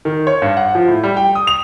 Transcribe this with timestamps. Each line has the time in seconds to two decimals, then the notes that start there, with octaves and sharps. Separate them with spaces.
0.05 D#3
0.27 C#5
0.42 G2
0.57 F#5
0.75 F3
0.88 A2
1.03 G3
1.17 G5
1.35 D#6
1.47 F7